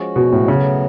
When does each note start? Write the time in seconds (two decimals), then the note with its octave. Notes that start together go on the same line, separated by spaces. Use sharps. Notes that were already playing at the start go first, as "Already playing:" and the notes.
Already playing: F3 G#3 C#4 F#4
0.16 B2
0.32 A2
0.48 A2 C#3 F#3 B3